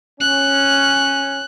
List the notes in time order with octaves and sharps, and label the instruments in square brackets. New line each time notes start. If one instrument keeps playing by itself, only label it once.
[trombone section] C#4 [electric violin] F#6